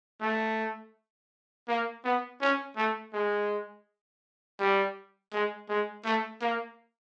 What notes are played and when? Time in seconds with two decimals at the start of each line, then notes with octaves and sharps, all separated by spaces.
0.21 A3
1.68 A#3
2.05 B3
2.41 C#4
2.77 A3
3.14 G#3
4.60 G3
5.33 G#3
5.69 G#3
6.05 A3
6.41 A#3